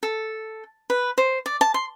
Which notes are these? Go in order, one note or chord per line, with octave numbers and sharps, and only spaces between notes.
A4
B4
C5
D5
A5
C6